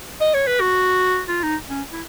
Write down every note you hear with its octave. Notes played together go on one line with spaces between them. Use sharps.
D#5
C#5
B4
F#4
F4
D#4
C#4
E4